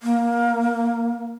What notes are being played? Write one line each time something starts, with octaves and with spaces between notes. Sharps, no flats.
A#3